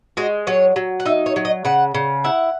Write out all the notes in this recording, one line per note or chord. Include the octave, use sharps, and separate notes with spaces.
G#3 F#4
F#3 C#5
F#3
F#5
D#4 E5
C#5
F#3
D#5
C#3 F#5
C#3
E4 F#5